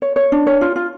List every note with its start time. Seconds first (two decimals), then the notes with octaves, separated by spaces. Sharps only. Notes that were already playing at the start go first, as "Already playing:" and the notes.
0.02 C#5
0.16 C#5
0.32 D4
0.47 C#5
0.61 F4
0.76 F4